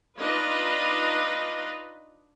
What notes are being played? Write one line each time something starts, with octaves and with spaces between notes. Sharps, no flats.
D4 D#4 F4 B4 D#5